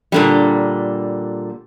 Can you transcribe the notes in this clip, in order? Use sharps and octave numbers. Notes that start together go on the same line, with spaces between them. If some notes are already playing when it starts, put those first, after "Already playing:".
A#2 D3 G3